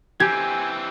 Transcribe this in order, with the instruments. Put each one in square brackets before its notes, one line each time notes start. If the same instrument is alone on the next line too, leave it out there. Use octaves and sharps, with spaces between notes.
[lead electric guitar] E3 C4 [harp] G4 [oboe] G#5 [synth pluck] G#6